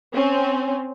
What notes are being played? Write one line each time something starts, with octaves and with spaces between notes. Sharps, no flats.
C4 C#4